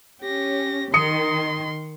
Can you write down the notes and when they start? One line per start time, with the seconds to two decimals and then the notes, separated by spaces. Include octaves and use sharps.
0.22 C#4 G4 A#6
0.94 D#3 C6 D#6 C#7